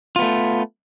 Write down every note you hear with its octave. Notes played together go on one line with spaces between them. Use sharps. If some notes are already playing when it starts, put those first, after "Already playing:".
A3 B3 F4